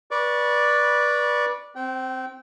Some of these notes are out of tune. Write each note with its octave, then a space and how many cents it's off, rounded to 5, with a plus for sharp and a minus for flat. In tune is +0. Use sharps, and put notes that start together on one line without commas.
B4 -25 D5 +0 C#6 +10
C4 +0 G5 -30